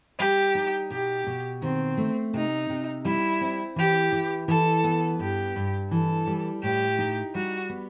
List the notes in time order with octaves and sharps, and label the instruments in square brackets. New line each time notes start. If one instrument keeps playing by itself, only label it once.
[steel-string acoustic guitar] G3 [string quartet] G4
[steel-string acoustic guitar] D#4
[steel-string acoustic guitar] B2 [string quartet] G4
[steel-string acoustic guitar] B2
[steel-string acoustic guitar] D#3 [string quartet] C4
[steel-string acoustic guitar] A3
[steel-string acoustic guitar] C3 [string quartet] D#4
[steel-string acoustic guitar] C3
[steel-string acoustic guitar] G3 [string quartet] E4
[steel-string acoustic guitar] C4
[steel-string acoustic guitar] E3 [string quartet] G4
[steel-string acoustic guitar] E3
[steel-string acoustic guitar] E3 [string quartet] A4
[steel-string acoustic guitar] B3
[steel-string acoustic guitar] G2 [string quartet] G4
[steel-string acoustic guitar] G2
[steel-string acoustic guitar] E3 [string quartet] A4
[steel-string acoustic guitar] G3
[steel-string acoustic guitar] A2 [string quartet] G4
[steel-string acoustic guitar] D#4
[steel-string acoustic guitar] G3 [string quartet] F#4
[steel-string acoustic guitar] B3